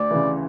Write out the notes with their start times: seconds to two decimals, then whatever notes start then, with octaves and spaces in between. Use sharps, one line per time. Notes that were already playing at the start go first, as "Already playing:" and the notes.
Already playing: D2 D5
0.11 C#3 E3